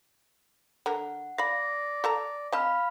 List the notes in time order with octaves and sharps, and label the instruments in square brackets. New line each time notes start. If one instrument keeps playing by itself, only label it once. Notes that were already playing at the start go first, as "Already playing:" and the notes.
[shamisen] D3 A#4 [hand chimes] F#5
[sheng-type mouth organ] D5 [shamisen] F5 B5 [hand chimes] A#6
[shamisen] A4 A5 A#5
[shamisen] C4 D#5 A5 [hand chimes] F5 B5 F6